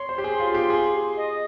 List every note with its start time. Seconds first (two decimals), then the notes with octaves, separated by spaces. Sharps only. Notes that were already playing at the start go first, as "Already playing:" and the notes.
Already playing: C#5 C6
0.09 C5
0.18 G4
0.24 G#4
0.40 F4
0.54 G4
0.70 G#4
1.17 D#5